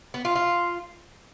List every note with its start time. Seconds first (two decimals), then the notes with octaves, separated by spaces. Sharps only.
0.14 B3
0.25 F4
0.35 F4